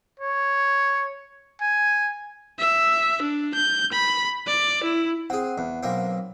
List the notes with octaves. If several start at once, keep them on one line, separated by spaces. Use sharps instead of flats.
C#5
G#5
E5
D4
G6
B5
D5
E4
C4 G#4 F#5
E2
B1 A#3 C4